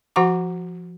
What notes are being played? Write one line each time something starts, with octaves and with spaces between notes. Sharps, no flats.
F3 F#4 F#5 A#5 D6